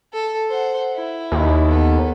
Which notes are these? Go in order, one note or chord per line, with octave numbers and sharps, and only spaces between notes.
A4
C5 F#5
E4
D#2
B3 A4